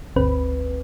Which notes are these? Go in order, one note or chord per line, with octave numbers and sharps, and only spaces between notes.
G1 D2 C4 B4